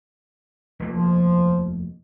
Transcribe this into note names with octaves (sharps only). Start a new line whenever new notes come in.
F1 D#2 A#3
F3